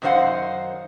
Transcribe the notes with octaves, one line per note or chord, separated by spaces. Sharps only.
F#2 D#3 D#4 C5 F5 F#5